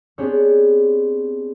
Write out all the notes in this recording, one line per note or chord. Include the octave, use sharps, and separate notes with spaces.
B3 C4 D4 G4 G#4 C#5